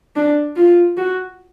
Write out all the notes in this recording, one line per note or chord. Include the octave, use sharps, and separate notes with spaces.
D4
F4
F#4